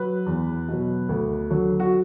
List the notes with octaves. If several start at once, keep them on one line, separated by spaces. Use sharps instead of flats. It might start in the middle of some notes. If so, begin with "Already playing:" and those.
Already playing: F#3 B4
E2
B2 F#3
D2
D3 F#3
F#4